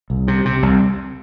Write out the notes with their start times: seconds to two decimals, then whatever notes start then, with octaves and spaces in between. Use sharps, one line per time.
0.10 C2
0.28 C3
0.45 C3
0.63 C2